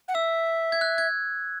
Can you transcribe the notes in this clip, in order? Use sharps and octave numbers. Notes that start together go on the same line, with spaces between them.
F#5
E5 E6
G#6
F#6
G#6